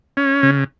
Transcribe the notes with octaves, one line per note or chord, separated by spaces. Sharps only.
C#4
C#3